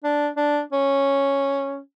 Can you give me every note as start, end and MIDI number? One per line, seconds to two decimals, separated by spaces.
0.04 0.29 62
0.37 0.61 62
0.72 1.79 61